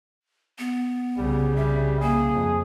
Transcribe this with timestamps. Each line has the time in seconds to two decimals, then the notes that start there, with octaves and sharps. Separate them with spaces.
0.59 B3
1.17 C2 C#3 G3
1.57 G3 E5
2.01 A#3 G#4
2.33 F2